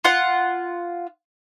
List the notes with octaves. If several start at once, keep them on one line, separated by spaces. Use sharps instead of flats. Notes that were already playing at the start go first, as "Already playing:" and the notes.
F4 F#5